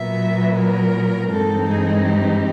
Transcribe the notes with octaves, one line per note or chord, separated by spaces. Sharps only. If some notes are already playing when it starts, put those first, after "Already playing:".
Already playing: A#2 F#3 B3 E5
A#4
G2 E3 G#3 C4 D#4 A4
G#4
G4